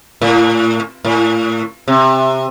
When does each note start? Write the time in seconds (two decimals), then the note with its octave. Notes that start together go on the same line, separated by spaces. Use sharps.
0.21 A2
1.05 A2
1.88 C3